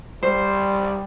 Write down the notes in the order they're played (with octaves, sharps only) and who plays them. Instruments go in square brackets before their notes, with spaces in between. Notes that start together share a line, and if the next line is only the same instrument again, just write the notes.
[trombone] G3 [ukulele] C5